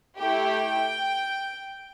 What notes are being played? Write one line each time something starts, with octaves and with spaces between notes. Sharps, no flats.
A3 E4 G4 G5